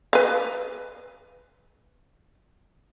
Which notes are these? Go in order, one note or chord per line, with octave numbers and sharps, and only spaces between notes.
B4 F5